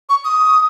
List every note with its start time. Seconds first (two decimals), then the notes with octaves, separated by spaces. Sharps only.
0.09 C#6
0.25 D#6